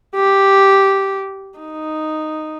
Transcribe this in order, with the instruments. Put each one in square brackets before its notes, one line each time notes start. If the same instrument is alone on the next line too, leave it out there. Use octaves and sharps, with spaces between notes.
[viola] G4
D#4